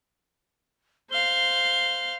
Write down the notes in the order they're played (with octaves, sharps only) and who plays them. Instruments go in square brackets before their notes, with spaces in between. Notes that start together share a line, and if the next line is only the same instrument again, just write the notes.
[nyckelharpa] C5 F5 [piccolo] G7